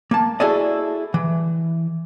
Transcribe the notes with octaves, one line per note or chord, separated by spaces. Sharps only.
A#3 A5
E4 F#4 G#4 A4 D5 D#5
E3